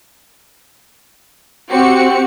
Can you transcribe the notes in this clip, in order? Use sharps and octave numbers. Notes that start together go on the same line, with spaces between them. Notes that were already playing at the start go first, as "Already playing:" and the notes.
C4 F#4 G4 C#7